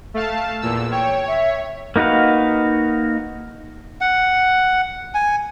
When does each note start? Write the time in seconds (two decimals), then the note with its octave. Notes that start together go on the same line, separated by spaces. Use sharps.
0.14 A3 F5 A5
0.62 E2 A#2 E6
0.92 C#5 G5
1.27 E5
1.96 A#3 D#4 F#4 B4 F5
4.01 F#5
5.14 G#5